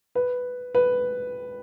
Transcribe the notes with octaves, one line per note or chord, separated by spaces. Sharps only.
B4
B4